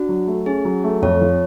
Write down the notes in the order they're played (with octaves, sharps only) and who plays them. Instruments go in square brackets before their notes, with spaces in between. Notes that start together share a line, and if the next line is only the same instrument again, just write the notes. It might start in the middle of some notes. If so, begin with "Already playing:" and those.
Already playing: [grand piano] D4 [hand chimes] F#4
[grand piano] F#3
A3
[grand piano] C#4 [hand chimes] G#4
[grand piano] F#3
A3
[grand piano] F2 [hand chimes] C#5
[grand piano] F3